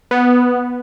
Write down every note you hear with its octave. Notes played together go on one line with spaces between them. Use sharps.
B3